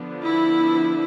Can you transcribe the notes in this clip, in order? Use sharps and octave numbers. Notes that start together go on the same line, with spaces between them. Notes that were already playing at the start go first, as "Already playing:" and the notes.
Already playing: D3 F3 B3 D4
E4